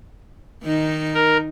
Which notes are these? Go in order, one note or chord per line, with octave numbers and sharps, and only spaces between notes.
D#3 D#4
A#4